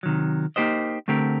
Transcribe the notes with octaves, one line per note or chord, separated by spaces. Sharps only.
C3 D#3 F#3
A#3 D#4 G4 C5 D#5
D3 A3 C4 G4 A#4